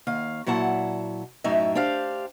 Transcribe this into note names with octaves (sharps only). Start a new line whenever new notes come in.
D#2 F5
A#2 F#3 E4 F#5 A5
F#2 A2 D#4 E5
D4 G4 C5 F5